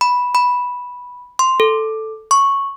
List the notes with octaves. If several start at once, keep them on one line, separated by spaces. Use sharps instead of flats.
B5
B5
C6
A4
C#6